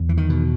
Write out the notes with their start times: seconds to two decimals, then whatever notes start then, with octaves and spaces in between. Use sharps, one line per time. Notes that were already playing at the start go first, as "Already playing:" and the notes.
Already playing: E2
0.09 E3
0.17 D#3
0.30 B2